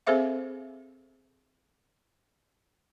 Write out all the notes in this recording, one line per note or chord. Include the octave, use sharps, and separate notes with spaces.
C4 G#4 A4 C5 E5 F5